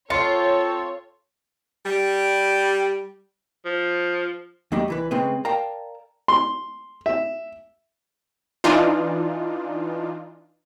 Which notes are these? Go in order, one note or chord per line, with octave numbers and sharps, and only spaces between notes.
C4 F4 A4 C#5 C6 C#7
G3
F3
D#2 F#3 G3 A3 D4 D#5
C2 E3 B4
C#3 G#3 A3 C4 B4
A#4 D5 F5 G5 A5 A#5
C6
E5
E3 D4 D#4 F4